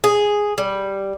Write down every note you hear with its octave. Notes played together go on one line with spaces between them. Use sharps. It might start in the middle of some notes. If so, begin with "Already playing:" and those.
G#4
G3